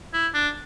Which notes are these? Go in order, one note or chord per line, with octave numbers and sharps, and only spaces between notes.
E4
D4